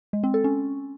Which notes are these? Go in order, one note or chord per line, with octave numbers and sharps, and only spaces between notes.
G#3
C4
A4
C#4